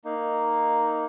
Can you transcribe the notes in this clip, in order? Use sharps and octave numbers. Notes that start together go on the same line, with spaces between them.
A#3 D#4